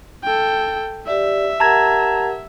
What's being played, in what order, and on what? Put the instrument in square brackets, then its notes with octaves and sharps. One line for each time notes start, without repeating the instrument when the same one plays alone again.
[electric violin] A4 G5
[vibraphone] G4 D5 [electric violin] E5
[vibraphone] G4 A#4 F#5 [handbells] A5 A#5 G#6